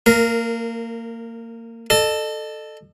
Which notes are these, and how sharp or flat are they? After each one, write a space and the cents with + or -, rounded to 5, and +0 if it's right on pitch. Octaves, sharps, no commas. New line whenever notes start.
A#3 -25 A#4 +0
A4 +0 D#5 -40